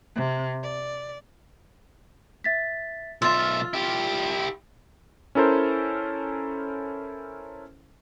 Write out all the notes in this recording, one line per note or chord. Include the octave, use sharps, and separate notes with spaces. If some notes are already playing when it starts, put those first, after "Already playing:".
C3
D5
E5 A6 B6
B1 F4 E5 E6 A6
E4 G4
C#4 E4 A4 A#4 C5